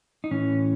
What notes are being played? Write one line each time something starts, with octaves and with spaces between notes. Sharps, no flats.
D#4
A2 E3 C#4